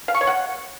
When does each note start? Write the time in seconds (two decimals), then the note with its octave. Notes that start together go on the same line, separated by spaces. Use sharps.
0.08 F5
0.15 C#6
0.21 C#5
0.27 F#5